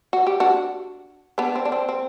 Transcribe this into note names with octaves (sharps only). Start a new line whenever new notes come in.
F#4
G4
D4 F#4
B3 D4
C4
D4
C4
C4